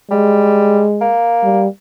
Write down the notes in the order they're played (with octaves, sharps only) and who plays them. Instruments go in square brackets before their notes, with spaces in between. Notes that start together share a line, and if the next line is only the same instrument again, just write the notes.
[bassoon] G3 [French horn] G#3
[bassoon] A#3
[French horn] G3